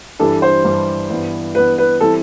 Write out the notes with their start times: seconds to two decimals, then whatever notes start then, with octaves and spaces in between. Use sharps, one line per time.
0.19 G2 E3 G3 D4 A4
0.42 C5
0.64 G2 E3 G3 D4
1.11 G2 E3 B3
1.55 G2 E3 B3 B4
1.78 B4
2.01 E3 G3 C4 E4 A4